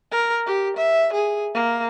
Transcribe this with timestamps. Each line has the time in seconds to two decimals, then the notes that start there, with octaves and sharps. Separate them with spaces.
0.11 A#4
0.46 G4
0.77 E5
1.13 G#4
1.54 A#3